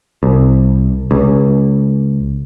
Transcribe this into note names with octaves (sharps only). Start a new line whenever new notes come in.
C2
C#2